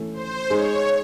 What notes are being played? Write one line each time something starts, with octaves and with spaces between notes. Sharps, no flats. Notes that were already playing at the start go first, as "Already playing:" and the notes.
Already playing: E3 A3 C#4
C5
G#3 D#4 G#4 C#5